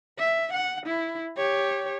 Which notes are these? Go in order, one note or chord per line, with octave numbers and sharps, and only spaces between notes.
E5
F#5
E4
G4 C#5